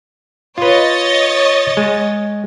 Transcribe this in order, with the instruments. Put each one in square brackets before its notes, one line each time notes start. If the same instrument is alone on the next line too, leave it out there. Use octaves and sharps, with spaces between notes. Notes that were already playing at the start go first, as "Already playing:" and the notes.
[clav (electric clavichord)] F4 B4 [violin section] C#5 D#5 A6
[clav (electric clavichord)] G#3